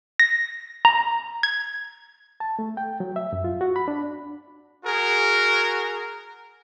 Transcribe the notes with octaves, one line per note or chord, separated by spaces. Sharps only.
A#6
A#5
G#6
A5
A3
G5
F#3
E5
F#2
F4
F#4
B5
D4
F#4 G#4 A#4